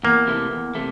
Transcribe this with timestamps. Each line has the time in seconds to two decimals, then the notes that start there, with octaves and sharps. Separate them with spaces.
0.03 E2 A#3
0.27 C3 E3 A3
0.52 E2
0.75 C3 A3